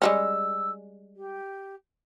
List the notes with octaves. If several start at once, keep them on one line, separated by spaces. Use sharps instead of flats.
G3 G#3 C#4 E6
G4